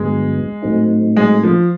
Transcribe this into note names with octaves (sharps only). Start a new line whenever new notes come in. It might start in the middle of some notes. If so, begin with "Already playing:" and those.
Already playing: G2 D3 F#3 G#3 B3
A2 F#3 A3 C4 D#4
G#3
F3